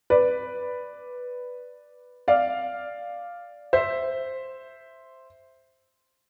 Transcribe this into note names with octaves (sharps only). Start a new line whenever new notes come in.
B4 D5
D5 F5
C5 E5